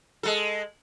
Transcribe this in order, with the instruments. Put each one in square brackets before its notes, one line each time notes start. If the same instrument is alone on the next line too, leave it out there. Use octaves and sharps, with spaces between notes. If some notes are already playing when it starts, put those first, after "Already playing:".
[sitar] G#3 A4